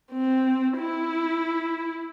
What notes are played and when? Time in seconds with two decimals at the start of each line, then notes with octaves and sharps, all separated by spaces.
0.13 C4
0.78 E4